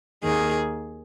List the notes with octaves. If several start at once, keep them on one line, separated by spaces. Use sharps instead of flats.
D#2 D#3 A#3 G#4